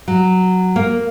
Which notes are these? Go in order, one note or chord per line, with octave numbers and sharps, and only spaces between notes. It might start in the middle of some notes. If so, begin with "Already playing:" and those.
F#3
A#3